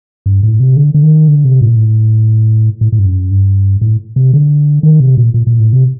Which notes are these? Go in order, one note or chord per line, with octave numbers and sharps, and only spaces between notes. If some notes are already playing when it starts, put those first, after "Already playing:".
G2
A2
C3
D3
D3
D#3
D3
C3
A2
A#2
A2
A2
A2
G2
F#2
G2
A2
C3
D3
D#3
C3
A#2
A#2
A#2
A2
C3